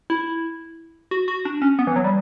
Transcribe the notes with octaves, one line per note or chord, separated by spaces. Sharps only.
E4
F#4
F#4
D4
C#4
B3
E3
F#3
G3